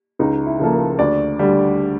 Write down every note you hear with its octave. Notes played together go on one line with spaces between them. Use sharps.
C#2 D#4
E4
C#3 F3 A#3 A4
A#4
D2 D5
D3 G3